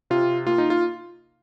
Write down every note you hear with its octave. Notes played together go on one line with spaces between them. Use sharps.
C3 F4
A#3 F4
D#4
F4